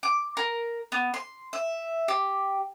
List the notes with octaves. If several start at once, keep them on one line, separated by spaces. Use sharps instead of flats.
D6
A#4
B3
C6
E5
G4